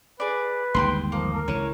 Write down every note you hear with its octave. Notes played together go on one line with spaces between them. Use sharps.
G#4 B4 D5
G1 D#2 G#3 G5 B5 C6
F3 A#3
A#4
C#2 E3 C#5